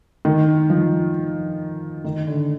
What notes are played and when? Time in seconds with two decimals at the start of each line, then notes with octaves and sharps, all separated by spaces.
0.25 D#3
0.70 F3
2.04 D#3
2.27 D3